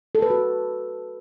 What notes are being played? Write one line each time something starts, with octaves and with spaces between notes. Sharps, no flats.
A4
B4
F#4